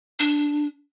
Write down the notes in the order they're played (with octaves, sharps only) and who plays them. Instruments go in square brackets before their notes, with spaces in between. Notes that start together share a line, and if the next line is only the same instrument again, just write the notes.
[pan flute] D4